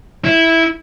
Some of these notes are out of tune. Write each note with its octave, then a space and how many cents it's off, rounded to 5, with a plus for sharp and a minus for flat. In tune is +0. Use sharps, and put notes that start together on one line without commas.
E4 -10